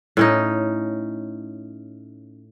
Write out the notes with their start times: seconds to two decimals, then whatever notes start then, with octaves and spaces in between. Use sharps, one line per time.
0.17 A2 C#4 D#4